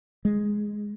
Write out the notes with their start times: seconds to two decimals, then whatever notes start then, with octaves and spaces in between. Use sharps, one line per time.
0.25 G#3